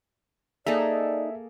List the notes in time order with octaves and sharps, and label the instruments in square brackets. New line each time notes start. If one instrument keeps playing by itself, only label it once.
[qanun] A#3 G#4 A4 [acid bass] D#4 [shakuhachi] D5 [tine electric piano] E5